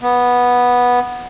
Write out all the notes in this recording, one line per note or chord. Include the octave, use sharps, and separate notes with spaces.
B3